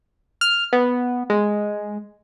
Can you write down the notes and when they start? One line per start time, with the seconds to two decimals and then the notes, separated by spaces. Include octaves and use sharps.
0.41 F6
0.73 B3
1.30 G#3